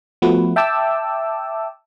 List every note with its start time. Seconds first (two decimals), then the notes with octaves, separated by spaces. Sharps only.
0.22 F3 A3 B3 F#4 B4
0.56 E5 G5 A5 D6 E6